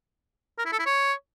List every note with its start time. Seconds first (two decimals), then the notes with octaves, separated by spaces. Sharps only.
0.58 A#4
0.65 E4
0.72 A4
0.79 E4
0.86 C#5